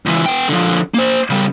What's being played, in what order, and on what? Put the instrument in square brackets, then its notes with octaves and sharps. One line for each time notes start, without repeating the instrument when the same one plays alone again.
[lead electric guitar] C#2 E3
B3 G5
D3 F3
A#3 C5
C#3 G3